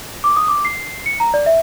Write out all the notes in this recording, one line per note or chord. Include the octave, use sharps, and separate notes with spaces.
D6
D#6
D6
C7
C#7
A#5
D5
E5